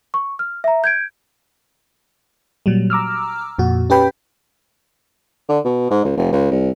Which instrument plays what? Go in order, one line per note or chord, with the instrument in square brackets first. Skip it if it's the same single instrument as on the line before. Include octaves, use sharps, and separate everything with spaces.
[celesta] C#6
F6
E5 A#5
G6 G#6 D7
[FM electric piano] A#2 F#3 G3
A#5 D6 E6 F6
F2 A#2 F#4
C#4 G4 B4 G5 B5
[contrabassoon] D3
B2
G#2
C#2
F1
C#2
C2